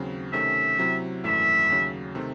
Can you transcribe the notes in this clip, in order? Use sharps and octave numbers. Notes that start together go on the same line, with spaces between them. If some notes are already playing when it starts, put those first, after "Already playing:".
Already playing: D#2 C#3 F#3 C4
C3 D#3 A3 C#4 E5
C3 F#3 C4 E4
G#1 F#2 E3 A3 E5
D#2 C#3 F#3
C3 D#3 A3 C4